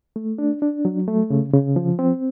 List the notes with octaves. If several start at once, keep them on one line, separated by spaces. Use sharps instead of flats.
A3
D4
D4
F#3
A3
C#3
C#3
F3
C4